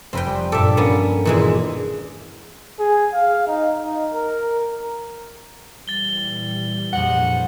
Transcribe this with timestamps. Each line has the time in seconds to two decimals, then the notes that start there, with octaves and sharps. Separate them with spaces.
0.13 F1 C4 B4 G5 B6
0.26 G3
0.52 G2 A#2 A4 E5 D6
0.77 A#3 B3 C#4 A4
1.25 E1 A#2 D#3 E3 G#3
2.80 G#4
3.13 F5
3.47 D#4
3.82 D#4
4.13 A#4
5.88 A#2 E3 G3 A6 G7
6.93 A#1 F2 F#5